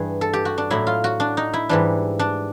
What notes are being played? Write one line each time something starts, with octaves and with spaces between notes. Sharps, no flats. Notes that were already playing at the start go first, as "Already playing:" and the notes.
Already playing: G2 E3 G3 G#4
A4
G4
F#4
D4
A2 F#3 E4
F4
F#4
D4
D#4
E4
G#2 E3 G3 D4
D4